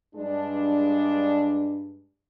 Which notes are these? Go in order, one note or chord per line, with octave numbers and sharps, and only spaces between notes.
G2 G#3 D4